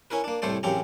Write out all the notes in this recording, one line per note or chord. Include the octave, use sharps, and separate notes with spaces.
C#4 E4 A#4 B4
A#3 D4
C2 A2 A3 C5 D5
A1 F#2 C#3 C4 G4 A#5